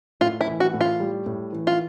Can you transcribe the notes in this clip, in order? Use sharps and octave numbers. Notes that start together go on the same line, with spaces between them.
A2 F4
E4
E3
F#4
A2
F4
G3
A2
E3
F4